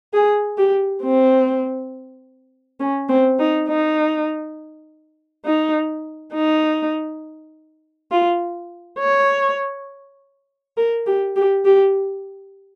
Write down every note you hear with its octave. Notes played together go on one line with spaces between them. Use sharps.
G#4
G4
C4
C#4
C4
D#4
D#4
D#4
D#4
F4
C#5
A#4
G4
G4
G4